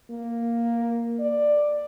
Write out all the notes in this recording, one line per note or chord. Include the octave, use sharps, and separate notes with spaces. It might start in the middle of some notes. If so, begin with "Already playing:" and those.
A#3
D5